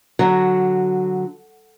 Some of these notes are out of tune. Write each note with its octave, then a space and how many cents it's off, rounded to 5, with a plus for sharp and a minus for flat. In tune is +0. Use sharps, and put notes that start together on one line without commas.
D3 +0 F#3 +0 F#4 +0